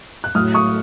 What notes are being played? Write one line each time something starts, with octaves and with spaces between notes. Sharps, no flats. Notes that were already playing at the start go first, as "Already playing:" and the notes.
F#6
A2 F#3 D#6 F6
C#6 D#6